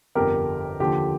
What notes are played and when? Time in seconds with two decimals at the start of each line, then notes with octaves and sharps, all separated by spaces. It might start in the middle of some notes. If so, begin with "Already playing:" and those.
0.15 G1 F2 D3 G4 A#4
0.80 D#2 D3 F3 G4